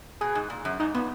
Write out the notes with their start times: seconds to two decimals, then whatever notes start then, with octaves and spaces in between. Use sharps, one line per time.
0.21 B2 G#4
0.35 G#2
0.50 A#2
0.65 F#2
0.80 G#2 D#4
0.95 A#2 B3